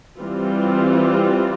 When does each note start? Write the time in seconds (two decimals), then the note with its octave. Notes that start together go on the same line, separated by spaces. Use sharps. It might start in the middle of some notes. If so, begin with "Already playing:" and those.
0.19 E3 G3 C4 F4